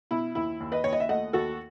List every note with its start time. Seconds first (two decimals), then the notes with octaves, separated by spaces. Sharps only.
0.11 B2 E4
0.35 D#2 E4
0.60 D#2
0.72 B4 D#5
0.84 D#2 C#5
0.93 D#5
1.00 E5
1.09 A3 D#5 F#5
1.33 D#2 F#4 A4